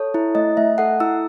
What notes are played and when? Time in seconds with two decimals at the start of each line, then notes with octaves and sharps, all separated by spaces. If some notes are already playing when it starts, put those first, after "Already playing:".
Already playing: A4 C#5
0.14 E4
0.35 A3 D#5
0.57 A3 E5
0.78 A4 F#5
1.00 E4 E6